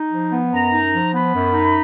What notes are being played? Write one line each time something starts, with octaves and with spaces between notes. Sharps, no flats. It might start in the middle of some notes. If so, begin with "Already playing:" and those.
Already playing: D#4
F3
B3
F#2 A#5
D#4
F3
B3 B5
F#2
D#4